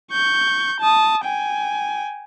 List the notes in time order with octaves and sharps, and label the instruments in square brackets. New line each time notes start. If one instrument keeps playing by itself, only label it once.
[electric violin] C#6 G6
A5 D#6
G5 G#5